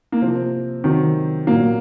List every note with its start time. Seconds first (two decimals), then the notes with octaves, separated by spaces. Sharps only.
0.12 A#3
0.22 C3 F3 C4
0.84 C3 D#3 F#3
1.47 A#2 F#3 A#3